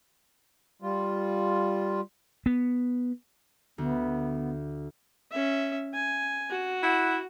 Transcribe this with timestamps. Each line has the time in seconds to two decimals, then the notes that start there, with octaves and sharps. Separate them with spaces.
0.82 G3 F4
2.46 B3
3.78 D2 B3
5.32 C#4 E5
5.94 G#5
6.50 F#4
6.83 E4 F#5